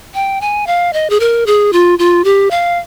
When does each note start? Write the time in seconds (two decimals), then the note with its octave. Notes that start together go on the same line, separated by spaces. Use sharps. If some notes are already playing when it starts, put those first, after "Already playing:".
0.14 G5
0.41 G#5
0.67 F5
0.93 D#5
1.10 G#4
1.20 A#4
1.46 G#4
1.73 F4
1.99 F4
2.24 G4
2.51 F5